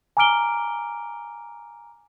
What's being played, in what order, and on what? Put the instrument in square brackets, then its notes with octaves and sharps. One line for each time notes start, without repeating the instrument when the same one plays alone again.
[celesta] G#5 A#5 D6 F6 D7 G7